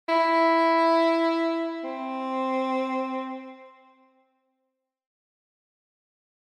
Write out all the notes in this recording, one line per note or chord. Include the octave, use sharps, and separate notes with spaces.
E4
C4